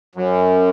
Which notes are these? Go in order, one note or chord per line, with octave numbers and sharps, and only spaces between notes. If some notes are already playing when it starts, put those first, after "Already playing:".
F#2